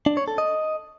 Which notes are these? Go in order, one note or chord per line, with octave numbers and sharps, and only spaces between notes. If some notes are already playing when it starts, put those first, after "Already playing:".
D4
C#5
A4
D#5